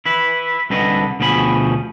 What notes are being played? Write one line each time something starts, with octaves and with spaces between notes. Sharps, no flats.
E4 B4
C2 D3 B4 D#5
D2 B2 F3 G#4 B5